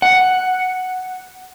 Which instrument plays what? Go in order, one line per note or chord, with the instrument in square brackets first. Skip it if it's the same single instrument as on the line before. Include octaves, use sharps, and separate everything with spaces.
[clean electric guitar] F#5